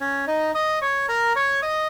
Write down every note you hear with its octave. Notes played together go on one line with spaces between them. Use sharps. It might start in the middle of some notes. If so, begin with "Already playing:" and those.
C#4 C#5
D#4 D#5
D#5 D#6
C#5 C#6
A#4 A#5
C#5 C#6
D#5 D#6